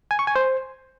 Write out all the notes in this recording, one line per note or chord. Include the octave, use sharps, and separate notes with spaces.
G#5
C#6
G#5
C5